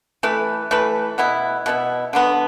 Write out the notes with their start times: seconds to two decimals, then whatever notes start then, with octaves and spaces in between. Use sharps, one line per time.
0.23 E3 A3 E4 B4
0.71 E3 A3 E4 B4
1.18 B2 B3 E4
1.66 B2 B3 E4
2.13 D3 F#3 B3